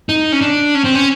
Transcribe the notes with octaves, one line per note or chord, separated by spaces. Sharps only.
D#4
C#4
D4
C#4
C4
C#4